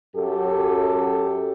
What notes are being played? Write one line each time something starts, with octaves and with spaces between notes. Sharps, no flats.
F#2 G4 A4